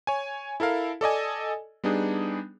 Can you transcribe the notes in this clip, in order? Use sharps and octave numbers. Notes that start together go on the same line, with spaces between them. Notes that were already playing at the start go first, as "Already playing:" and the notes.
C#5 G#5
E4 A4 A#4 F5
A4 D5 D#5 G#5
G3 B3 D4 D#4 G#4